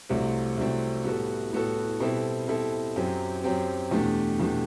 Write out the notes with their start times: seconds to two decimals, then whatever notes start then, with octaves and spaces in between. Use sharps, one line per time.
0.09 C2 C3 F#3 A3 C4
0.57 C2 C3 F#3 A3 C4
1.05 A2 G3 B3 F#4 A4
1.53 A2 G3 B3 F#4 A4
2.00 B2 G3 C4 E4 A4
2.48 B2 G3 C4 E4 A4
2.96 F#2 F#3 C4 G4
3.44 F#2 F#3 C4 G4
3.91 E2 B2 A3 D4 G4
4.40 E2 B2 A3 D4 G4